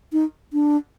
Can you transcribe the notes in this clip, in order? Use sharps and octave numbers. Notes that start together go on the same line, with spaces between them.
D#4
D4